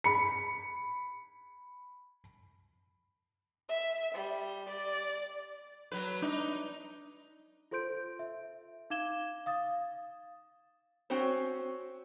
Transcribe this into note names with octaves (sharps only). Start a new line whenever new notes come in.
B5 C#7
E5
G3
D5
F#3 B4
D4 D#4
F4 A4 C5 C6 G6 D7
E5
D#4 F5 D6 G#6 E7 G7
F5 D#6 A6
C4 C#4 F#4 C5